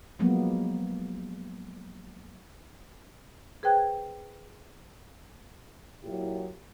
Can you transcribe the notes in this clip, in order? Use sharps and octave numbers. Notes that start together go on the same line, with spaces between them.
F3 F#3 G#3 A#3 B3
G#4 B4 C5 G5 F#6 G#6
A#2 F#3 E4 G4